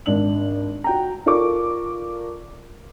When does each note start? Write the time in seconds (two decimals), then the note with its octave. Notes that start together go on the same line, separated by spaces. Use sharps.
0.06 G#1 D4 F#7
0.84 F#4 G5 A#5
1.26 F4 A4 A#4 D5 C#6 D6